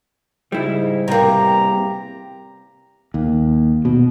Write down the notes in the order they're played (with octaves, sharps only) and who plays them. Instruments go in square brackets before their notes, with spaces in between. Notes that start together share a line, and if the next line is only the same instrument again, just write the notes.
[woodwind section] G#2 C#3 [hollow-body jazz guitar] G3 E4
[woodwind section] E2 G4 A#5 [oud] C3 A#3
[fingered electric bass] D#2
B2